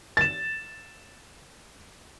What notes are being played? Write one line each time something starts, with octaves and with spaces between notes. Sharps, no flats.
A6 E7